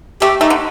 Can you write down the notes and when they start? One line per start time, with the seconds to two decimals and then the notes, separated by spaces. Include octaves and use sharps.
0.22 A3 G4
0.41 A3 D#4
0.50 D3